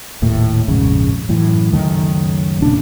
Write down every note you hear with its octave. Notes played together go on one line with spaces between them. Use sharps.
D#1 D#2 A2
A#1 F2 G#2 C#3
F#2 A2 E3
C#2 F#2 D#3 A3
E1 A#2 C#3 D4